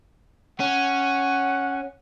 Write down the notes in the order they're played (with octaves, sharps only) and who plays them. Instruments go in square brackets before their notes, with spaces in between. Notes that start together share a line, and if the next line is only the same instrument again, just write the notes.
[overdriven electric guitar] C#4 [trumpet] F#5